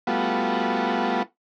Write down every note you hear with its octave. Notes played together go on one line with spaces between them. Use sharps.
G3 A3 B3 F4 F#4